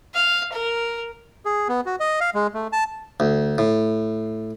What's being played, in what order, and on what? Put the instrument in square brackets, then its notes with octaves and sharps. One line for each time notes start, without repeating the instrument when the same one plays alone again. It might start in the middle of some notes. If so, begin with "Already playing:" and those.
[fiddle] F5
A#4
[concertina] G#4
B3
F#4
D#5
F5
G#3
A3
A5
[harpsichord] D2
A2